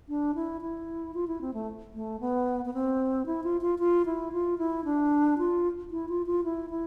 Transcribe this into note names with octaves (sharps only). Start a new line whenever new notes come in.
D4
E4
E4
F4
E4
C4
A3
A3
B3
B3
C4
E4
F4
F4
F4
E4
F4
E4
D4
F4
E4
F4
F4
E4
E4